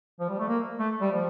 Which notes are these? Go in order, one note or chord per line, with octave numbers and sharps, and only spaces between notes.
F3
G3
A3
A#3
A3
G3
F3